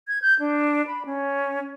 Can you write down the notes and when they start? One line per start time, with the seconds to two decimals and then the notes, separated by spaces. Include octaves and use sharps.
0.08 G#6
0.22 G6
0.40 D4
0.87 B5
1.06 C#4